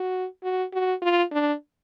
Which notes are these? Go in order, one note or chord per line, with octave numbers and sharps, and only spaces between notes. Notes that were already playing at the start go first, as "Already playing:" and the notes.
Already playing: F#4
F#4
F#4
F4
D4